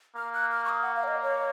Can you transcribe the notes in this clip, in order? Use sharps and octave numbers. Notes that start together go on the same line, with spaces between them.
A#3 F6
F#6
F6
C#6
D#6
F#5
F5
C#5
D#5
C#5